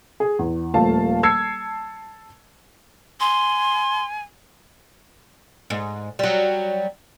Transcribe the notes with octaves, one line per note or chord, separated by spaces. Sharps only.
G#4
E2
D#1 F3 A3 F5 A5
A5 E6 G#6 C7 C#7
G#5 C6
G#2
F#3 G3